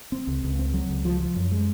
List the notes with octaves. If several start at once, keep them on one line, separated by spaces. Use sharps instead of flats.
C4
C#2
C#2
C4
F#3
C#2
F3
F3
F#2
G#3